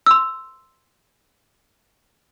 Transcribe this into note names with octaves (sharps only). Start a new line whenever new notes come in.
C6 E6